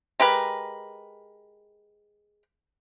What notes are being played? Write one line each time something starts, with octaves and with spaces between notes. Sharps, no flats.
G#3 G4 A#4 B4